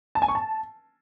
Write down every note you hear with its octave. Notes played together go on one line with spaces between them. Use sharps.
A5
G#5
C#6
A5